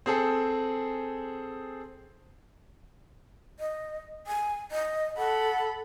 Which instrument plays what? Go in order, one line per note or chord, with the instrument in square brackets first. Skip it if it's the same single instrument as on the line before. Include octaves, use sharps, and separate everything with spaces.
[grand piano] C4 G#4 A4
[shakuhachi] D#5
G#5
D#5
[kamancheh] A4 B5 [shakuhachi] F#5